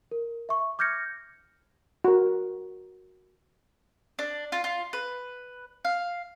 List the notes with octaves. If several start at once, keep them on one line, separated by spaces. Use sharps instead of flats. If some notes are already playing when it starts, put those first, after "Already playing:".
A#4
E5 C#6
D6 F6 G6 G#6 A#6 C#7
F#4 A#4
D4
F4
F4
B4
F5